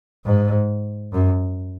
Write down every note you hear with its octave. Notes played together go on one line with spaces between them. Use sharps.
G#2
F#2